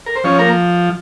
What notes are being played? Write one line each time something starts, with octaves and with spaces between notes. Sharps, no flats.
A#4
C5
F3 C#4 C#5
A#3 A#4